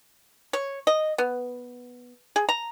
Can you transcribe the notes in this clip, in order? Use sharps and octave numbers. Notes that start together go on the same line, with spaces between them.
C#5
D#5
B3
G#4
A#5